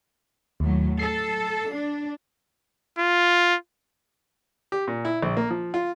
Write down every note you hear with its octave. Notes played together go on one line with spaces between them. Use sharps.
D#2 A2 F#3
A4 C7
D4
F4
G4
A#2
E4
A#1
A#3
F3
F4